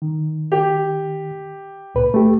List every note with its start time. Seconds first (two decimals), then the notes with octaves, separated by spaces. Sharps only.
0.02 D#3
0.52 G4
1.95 C#2 A#2 B4
2.14 A3 G4